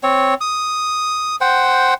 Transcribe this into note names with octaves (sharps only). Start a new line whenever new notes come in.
C4 C#5
D#6
C5 F#5 G5